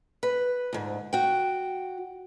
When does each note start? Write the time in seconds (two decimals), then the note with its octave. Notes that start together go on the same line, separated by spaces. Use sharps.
0.23 B4
0.73 D2 G#2
1.13 F#4 G5